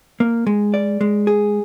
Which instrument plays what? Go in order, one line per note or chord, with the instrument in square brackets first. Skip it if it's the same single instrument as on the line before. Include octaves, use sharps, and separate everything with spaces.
[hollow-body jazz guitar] A#3
G#3
D5
G#3
G#4